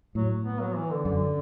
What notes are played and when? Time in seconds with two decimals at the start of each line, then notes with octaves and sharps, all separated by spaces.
0.15 A2 F#3
0.45 B3
0.60 F#3
0.76 E3
0.91 D3
1.05 F#2 D3